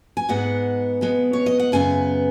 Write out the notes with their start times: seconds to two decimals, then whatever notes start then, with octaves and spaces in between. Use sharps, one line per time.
0.17 G#5
0.29 G#2 G#3 B3 F#5
1.01 B2 G#3 B3
1.33 C#5
1.46 D#5
1.59 F#5
1.72 F#2 C#3 B3 G#5